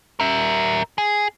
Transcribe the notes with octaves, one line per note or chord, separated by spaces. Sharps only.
A#4 E5
G#4